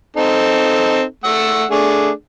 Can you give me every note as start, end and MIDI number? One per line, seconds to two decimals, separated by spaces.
0.16 1.03 60
0.16 1.03 63
0.16 1.03 69
1.24 1.64 57
1.24 1.64 78
1.24 1.64 88
1.71 2.10 57
1.71 2.10 62
1.71 2.10 68